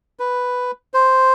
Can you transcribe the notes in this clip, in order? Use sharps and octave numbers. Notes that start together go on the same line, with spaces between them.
B4
C5